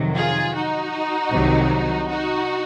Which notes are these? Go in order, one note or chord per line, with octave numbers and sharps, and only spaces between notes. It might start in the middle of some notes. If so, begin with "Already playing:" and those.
Already playing: F2 C3 D#3 F#3
F4 G#4
D#4 F#4
C2 C3 D#3 F#3
D#4 F#4